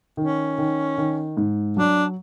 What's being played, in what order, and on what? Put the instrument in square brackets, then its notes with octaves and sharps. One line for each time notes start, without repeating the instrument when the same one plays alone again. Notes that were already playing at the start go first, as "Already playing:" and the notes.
[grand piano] D#3 [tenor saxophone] C#4
[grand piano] D#3
D#3
G#2
[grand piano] F#3 [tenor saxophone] D4